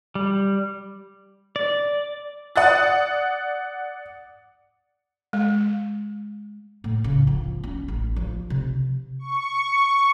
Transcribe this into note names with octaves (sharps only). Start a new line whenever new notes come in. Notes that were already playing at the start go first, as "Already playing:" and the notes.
G3
D5
D5 F#5 D#6 F#6 A6
G#3
A2
C#3
F3
C#4
A1
F3
C3
C#6